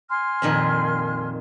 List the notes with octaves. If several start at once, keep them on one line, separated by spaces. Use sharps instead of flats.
G#5 C6 F6
F2 A#2 D#3